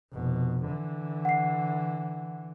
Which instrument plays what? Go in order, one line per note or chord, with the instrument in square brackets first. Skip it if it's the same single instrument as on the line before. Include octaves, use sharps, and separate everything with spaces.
[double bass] F1 B2
D3 E3
[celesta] F#5 C7